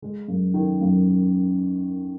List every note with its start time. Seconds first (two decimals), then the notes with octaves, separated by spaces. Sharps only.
0.02 G#3
0.28 F#2
0.54 D#3
0.81 F#2